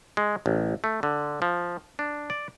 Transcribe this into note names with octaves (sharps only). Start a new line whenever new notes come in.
G#3
A1
A3
D3
F3
D4
D5